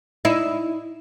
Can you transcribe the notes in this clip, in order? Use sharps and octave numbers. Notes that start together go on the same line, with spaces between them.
D#4 E4